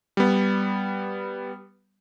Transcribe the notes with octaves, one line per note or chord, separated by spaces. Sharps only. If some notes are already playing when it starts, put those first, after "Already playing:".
G3 B3